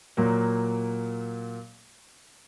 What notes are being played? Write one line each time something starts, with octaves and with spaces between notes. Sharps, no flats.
A#2 F#3 A#3